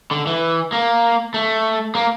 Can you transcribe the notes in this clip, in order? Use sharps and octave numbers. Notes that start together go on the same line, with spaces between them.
D3
E3
A#3
A3
A#3